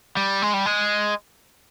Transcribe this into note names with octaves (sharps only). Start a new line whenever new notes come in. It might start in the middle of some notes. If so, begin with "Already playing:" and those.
G3
G#3
G3
G#3